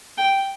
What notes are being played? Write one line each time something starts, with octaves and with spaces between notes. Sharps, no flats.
G5